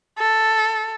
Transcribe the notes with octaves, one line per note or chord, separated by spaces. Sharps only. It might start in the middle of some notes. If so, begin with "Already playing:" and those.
A4